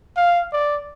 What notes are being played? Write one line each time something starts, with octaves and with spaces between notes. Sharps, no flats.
F5
D5